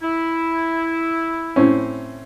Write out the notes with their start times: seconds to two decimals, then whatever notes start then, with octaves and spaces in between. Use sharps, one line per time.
0.02 E4
1.56 A2 C4 C#4